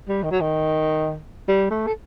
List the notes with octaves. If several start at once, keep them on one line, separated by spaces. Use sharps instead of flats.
G3
D#3
F#3
D#3
G3
A3
A4